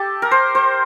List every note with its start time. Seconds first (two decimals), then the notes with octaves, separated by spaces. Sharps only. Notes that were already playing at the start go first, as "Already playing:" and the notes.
Already playing: G4 A4
0.22 A#4
0.31 C5
0.55 C5